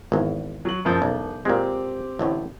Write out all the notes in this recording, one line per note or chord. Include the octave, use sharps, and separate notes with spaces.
G#1 E2
F#3 F#7
F#1 F3 G6
E1 B1
A#2 G#3 C4 G4
A1 D2 A2